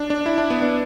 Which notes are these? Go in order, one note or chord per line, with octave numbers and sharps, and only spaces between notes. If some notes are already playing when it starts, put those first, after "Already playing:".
Already playing: D4
D4
E4
D4
B3
D4